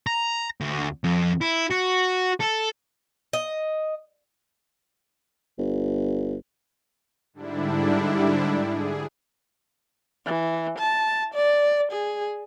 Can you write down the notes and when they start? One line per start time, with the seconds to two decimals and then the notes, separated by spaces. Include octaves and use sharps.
0.07 A#5
0.61 D2
1.04 F2
1.41 E4
1.70 F#4
2.40 A4
3.33 D#5
5.58 G1
7.33 G#2 D3 G3 D4 E4
8.64 G#4
10.26 E3
10.79 A5
11.34 D5
11.92 G#4